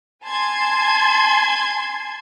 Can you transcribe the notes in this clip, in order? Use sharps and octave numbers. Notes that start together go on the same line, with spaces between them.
G#5 A5 C6 G#6